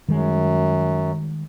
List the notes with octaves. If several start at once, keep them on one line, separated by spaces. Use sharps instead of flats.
F#2 D#3 G3 G#3